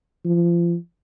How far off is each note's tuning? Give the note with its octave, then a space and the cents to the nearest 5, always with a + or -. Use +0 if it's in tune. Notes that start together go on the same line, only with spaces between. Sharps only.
F3 -30